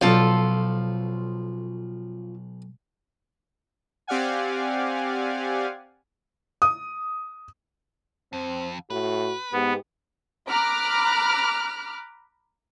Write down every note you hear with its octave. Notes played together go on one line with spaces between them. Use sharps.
B1 F3 F4 A4
C4 G4 D5 F5 F#5 G#5
D#6
F2 C4
A2 F#4 B4
G#2 B3 G4
A#5 B5 D6 F6 F#6